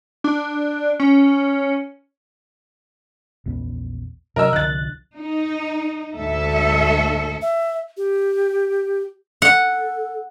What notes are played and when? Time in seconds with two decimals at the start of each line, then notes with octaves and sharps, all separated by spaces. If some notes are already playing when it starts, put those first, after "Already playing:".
0.24 D4
1.00 C#4
3.46 A#1 E2 B3
4.36 C3 F#3 A#4 D#5 E6
4.53 C2 D3 F3 F#6 A6
5.16 D#4
6.16 D2 G#2 A4 E5
7.42 E5
7.97 G4
9.42 A4 F#5